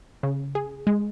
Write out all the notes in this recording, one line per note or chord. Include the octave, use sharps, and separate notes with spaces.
C#3
G#4
G#3